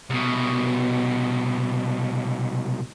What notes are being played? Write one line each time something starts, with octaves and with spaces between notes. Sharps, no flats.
C2 B2